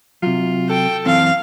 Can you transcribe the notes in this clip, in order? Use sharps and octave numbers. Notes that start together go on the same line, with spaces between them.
C3 F#3 F4
A4 G5
F#2 E3 C4 F5